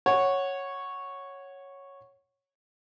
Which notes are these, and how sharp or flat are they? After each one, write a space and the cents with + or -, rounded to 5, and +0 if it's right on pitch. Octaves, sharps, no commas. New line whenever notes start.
C#5 -5 F#5 +0